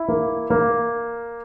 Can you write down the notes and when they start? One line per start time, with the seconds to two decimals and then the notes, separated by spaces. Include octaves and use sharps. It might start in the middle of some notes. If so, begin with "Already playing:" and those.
Already playing: E4
0.08 A#3
0.50 A#3